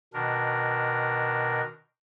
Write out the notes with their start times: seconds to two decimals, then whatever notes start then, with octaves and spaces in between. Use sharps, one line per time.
0.14 B2 D#3 D4 A#4